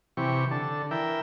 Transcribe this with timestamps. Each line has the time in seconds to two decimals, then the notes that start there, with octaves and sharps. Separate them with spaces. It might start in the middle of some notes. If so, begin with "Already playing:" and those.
0.17 C3 E3 G4 C#6
0.51 D3 A4
0.91 E3 A#4 E5 G5